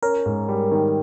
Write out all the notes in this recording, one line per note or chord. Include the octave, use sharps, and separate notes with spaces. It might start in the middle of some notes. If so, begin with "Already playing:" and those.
C#4 A#4
G#2
G3
D#3